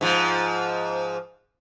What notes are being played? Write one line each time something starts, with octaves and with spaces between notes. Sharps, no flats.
G#2 F3